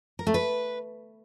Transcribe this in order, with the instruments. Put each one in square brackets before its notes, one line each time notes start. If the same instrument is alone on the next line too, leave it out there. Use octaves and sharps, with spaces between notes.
[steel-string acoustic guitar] A#4
A3
B4